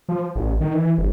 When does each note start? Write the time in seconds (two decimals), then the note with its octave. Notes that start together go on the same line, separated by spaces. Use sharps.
0.09 F3
0.36 A1
0.60 D#3
0.75 E3
0.98 G1